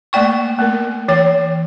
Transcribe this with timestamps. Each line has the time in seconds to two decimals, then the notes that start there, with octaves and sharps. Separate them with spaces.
0.13 A3 A#3 D5 G5 C#6
0.59 A3 B3 A#4
1.08 E3 C#5 G5